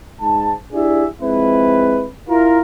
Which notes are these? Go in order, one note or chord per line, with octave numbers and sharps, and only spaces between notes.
G#2 A5
D4 E4 G4 G#4 D5 E5
F3 G#3 C4 E4 B4
E4 F4 A#4